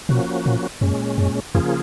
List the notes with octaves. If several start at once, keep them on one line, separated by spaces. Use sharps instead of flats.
B2 F3 A#3 C#4 F#4
A#2
F#2 A#2 G#3 C#4
F#2
F2 C#3 F3 A#3 F4 G#4